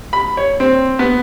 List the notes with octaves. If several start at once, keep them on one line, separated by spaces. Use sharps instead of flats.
B5
C#5
C4
B3